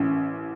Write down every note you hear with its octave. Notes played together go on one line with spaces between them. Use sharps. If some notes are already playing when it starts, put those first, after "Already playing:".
Already playing: A1 E3 C#4